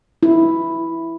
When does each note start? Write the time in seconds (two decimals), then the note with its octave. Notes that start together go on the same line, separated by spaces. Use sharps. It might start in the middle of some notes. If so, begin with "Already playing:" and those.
0.23 E4